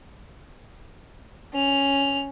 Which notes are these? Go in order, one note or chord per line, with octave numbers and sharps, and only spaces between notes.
C#4 F7